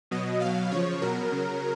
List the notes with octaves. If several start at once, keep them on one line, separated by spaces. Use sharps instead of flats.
B2 F#3 D#5
B2 F#3 F5
C#3 F3 C#5
B2 F#3 A#4
C#3 F#3